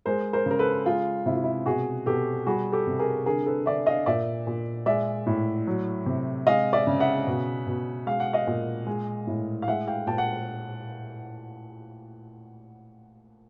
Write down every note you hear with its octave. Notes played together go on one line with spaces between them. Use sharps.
G#3 A#4 C5
A#4 C5
C#3 A#4
A4 B4
G#3 F4
C3 E4
F4
E4
B2 F#4 G#4
B2 G4 A4
G3 F#4 G#4
G4 A4
C3
G#4 A#4
D3 G#4 A#4
A4 B4
D3 D5 E5
D#5 F5
A#2 D5 E5
A#2
G#3 D5 E5
A2
F#3
C3
G#3 D#5 F5
D5 E5
C#3
E5 F#5
B2
B2
G#3 F5
F#5
D#5 F5
A#2
G#3
A2
F5
G#3 E5 F#5
F5 G5
A#2 G5 A5
F#5